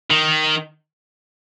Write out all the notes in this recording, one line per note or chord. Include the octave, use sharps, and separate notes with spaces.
D#3